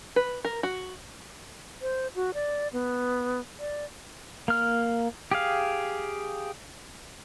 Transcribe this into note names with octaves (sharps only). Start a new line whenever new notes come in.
B4
A#4
F#4
C5
F#4
D5
B3
D5
A#3 F6
G4 G#4 F5